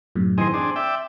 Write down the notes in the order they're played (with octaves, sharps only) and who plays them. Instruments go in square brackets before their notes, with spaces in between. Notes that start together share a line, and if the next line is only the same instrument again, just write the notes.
[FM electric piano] F#2 A2 C3
[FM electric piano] D#3 E3 C6 [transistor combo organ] C4 G#4 D#5
[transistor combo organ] C4 D4 G#4 [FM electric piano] C6
[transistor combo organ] D5 E5 G5